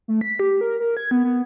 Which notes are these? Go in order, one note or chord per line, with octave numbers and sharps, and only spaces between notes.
A3
B6
G4
A#4
A#4
G#6
B3
B3